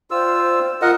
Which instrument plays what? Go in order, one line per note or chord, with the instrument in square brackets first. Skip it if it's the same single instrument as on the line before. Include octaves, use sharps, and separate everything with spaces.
[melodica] F4 E6 [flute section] C5 D5 G5
[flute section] F4 C6 [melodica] A#4 D#5 F#5